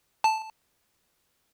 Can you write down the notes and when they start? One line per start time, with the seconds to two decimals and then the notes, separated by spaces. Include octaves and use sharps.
0.24 A5